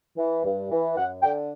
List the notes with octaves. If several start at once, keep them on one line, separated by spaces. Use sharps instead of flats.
E3
G2
E3
F#2 F#5
D3 G5